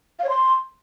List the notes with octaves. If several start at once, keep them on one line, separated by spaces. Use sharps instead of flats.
F5
C#5
C6